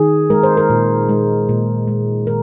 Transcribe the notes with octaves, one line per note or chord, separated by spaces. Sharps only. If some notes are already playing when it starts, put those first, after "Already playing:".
Already playing: D#3 G#4
G#3 A#4
C5
A#4
A#2
G#3
A#2
G#3
D#3 A#4